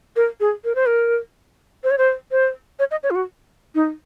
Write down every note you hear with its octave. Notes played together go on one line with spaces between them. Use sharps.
A#4
G#4
A#4
C5
A#4
C5
C#5
C5
C5
C#5
D#5
C#5
F4
F#4
D#4